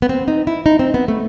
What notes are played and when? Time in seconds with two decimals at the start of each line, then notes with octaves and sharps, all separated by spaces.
0.02 B3
0.09 C4
0.28 D#4
0.47 E4
0.66 D#4
0.79 C4
0.94 B3
1.08 A3